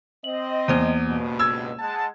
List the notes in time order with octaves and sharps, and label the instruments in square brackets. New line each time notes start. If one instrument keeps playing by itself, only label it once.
[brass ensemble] C4 D#5 [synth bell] F#7
[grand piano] E2 [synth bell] A#3 C5 D#7
[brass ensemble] C#2 G2 B2
[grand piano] E6 G#6
[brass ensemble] G#3 F#5 A5